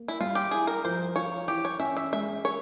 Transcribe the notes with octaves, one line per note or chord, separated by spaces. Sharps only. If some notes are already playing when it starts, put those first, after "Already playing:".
Already playing: A#3
E4
G3 F4
G4
E4 G#4
A#4
F3 C5
F4 C#5
E3 G4
C#5
C#4 E5
E5
G#3 E5
A#4 C#5